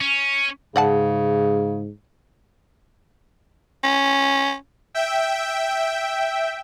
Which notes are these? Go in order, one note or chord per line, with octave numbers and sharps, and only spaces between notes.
C#4
G#2 C#3 D5 F#5 A5
C#4
E5 G5